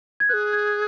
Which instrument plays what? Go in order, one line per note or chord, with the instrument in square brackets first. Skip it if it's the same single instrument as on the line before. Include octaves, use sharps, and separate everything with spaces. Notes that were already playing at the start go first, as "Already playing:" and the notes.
[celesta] G#6
[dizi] G#4 B4 [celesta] F#6
[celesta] G#6